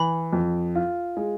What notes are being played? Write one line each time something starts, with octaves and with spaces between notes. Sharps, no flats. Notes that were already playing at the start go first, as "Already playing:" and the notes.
Already playing: E3 B5
F2
F4
G#3